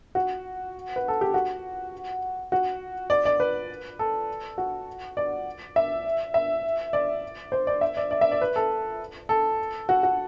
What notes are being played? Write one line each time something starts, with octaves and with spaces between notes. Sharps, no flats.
F#4
B4
A4
G4
F#4
F#4
D5
D5
B4
A4
F#4
D5
E5
E5
D5
C5
D5
E5
D5
D5
E5
D5
B4
A4
A4
F#4
F#4